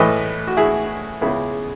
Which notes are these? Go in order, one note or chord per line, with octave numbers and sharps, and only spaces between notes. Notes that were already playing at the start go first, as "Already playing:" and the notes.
Already playing: A2 E3 A3 B4 D#5
F#4
E4 G#4
C#2 C#3 G#3 B3 E4 G#4